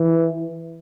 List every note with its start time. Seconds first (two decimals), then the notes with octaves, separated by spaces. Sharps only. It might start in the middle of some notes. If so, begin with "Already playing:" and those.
Already playing: E3